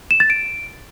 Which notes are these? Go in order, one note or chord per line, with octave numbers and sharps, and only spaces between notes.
E7
A6
D7